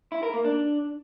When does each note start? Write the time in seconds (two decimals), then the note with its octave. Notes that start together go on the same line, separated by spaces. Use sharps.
0.12 E4
0.23 A#4
0.34 A#3
0.45 D4